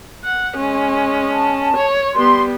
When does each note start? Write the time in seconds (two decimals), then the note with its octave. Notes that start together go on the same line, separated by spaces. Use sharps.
0.24 F#5
0.56 G#3 C#4
1.32 A5
1.76 C#5
2.15 G3 B3 C6